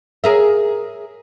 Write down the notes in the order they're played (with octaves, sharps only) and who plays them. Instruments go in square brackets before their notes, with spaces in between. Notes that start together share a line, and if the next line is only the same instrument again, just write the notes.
[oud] G#4 A#4 E5